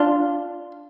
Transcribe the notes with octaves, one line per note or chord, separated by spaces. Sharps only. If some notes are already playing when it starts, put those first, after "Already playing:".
Already playing: D4 F4